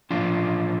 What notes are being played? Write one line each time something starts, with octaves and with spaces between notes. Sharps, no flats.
A2 F3 D4 F4